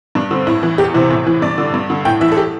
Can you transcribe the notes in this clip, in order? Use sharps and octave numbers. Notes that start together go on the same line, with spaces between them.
G2 D4
D3 C4
A2 E4
E3
E2 G4
C3 E3 C5
A2
E3
G2 D5
D3
G2
D3
A2 G5
E3 E5
A4
G4